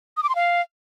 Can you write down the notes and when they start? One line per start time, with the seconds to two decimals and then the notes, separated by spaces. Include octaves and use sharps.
0.17 D#6
0.23 D6
0.29 C6
0.35 F5